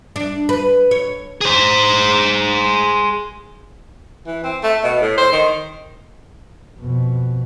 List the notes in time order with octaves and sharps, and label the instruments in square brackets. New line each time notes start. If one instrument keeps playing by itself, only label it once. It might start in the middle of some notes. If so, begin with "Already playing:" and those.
[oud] D4
B4
C#5
[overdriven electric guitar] G#4 C5
[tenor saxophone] E3
C4
A3
B2
A2
C5
D#3
[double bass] F2 B2